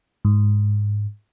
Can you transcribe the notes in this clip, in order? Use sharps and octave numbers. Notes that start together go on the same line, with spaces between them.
G#2